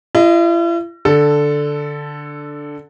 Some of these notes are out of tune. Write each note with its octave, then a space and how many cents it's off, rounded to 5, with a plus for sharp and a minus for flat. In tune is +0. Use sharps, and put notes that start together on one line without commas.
E4 +45 D#5 +0
D3 +0 A4 +0